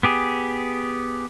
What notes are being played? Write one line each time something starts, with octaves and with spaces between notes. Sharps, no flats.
B3 G4 G#4